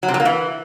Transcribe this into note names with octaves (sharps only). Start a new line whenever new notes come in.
F#3
C3
F#3
A#3
E3